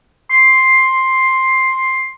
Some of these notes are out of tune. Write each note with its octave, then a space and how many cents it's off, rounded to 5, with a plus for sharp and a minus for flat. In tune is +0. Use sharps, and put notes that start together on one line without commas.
C6 +10